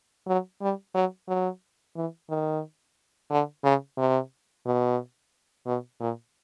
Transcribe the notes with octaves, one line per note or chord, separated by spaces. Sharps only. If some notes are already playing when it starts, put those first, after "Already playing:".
F#3
G3
F#3
F#3
E3
D#3
D3
C#3
C3
B2
B2
A#2